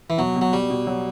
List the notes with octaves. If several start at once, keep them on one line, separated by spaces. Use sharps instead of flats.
E3
B2 F#3
B2
F#3
B2 G3
B2
F#3